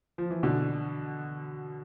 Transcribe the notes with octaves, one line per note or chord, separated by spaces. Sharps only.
F3
E3
B2 D3